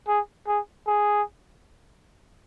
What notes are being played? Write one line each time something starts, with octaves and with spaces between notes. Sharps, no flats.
G#4
G#4
G#4